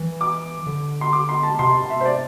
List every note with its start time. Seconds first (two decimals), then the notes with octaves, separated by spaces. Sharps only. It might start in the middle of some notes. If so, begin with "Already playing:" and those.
Already playing: E3
0.21 D6
0.67 D3
1.01 C6
1.13 D6
1.29 C6
1.43 A5
1.59 C3 C6
1.90 E5
2.01 C5
2.05 D5